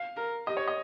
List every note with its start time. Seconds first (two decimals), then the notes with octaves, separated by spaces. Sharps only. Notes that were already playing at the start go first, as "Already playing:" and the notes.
Already playing: F5
0.17 A#4
0.47 G4 D#5
0.57 C#5
0.68 D#5